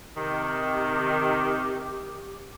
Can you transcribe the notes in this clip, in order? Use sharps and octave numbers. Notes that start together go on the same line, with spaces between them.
C3 D#3 G4